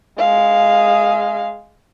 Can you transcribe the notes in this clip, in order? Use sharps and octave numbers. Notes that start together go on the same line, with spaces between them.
G#3 F5